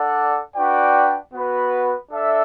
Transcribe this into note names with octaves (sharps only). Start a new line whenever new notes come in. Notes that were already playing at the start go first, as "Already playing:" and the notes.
Already playing: D4 A4 D5 F#5
D4 F#4 B4 D5 G5
B3 F#4 B4
D4 A4 E5